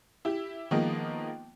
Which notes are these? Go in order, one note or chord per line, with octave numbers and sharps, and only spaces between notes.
E4 G4
D#3 F3 G#3 A#3 B3 D#4